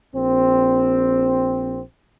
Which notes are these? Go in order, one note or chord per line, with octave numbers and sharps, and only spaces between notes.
A#1 C4